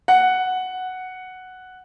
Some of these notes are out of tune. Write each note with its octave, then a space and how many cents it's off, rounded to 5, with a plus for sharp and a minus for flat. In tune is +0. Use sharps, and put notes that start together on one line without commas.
F#5 +0